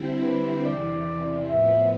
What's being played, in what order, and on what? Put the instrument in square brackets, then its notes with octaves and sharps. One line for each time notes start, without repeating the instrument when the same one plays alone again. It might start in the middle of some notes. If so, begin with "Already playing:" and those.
Already playing: [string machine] D3 G3 C4 E4
[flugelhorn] B4
[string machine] E2 C3 E3 [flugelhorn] D5
[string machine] A2 F3 B3 [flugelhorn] E5